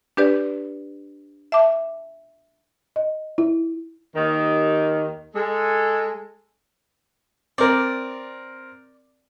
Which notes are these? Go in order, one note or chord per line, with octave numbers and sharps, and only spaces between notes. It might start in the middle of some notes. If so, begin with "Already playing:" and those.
D4 G4 B4 D5
E5 A5 D6
D#5
E4
D#2 D#3
G#3 A4
C4 A#4 D5